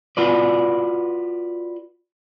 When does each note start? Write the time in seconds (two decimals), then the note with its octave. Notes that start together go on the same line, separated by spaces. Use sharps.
0.17 F4 F#4 B4 D5